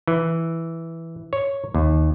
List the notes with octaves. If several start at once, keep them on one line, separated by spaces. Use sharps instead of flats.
E3
C#5
D#2